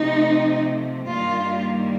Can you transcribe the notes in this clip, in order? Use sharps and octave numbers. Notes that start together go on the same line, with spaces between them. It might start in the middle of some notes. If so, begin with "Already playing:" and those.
Already playing: C3 F3 A3 C4 D#4
G2 D#3 G3 A#3 F4